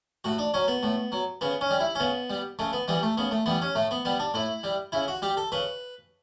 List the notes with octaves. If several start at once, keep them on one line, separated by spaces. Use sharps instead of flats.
A2 F#4
D4
F#3 C#4
B3
A2
F#3
C#3 B3
C#4
G3
E4
C#4
C#3 B3
G3
C#3 A3
B3
E3 G3 B3
A3
C#3 B3
A3
E3 G3 B3
C#4
A2 A3
B3
G3 B3
D4
A2 E4
G3
C#3 E4
F#4
G3 G4
A4
C#3 B4